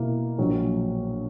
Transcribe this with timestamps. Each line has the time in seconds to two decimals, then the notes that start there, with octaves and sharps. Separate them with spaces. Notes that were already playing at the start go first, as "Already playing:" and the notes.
Already playing: B2 A#3 E4 A#4
0.38 A#1 A#2 F#3